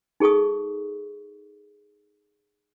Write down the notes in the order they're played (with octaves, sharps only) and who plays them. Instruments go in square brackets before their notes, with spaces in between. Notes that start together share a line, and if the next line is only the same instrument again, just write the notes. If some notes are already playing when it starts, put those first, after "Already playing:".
[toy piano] D#4 G#4 A4 C#6 D#6